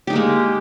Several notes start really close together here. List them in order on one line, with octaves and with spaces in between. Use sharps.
G4 D#4 A#3 G#3